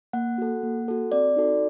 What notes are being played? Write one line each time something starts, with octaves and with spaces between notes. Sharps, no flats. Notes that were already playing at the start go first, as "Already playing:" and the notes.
A#3 F#5
F#4 A4
A#3
F#4 A4
C4 D5
D#4 F#4 A4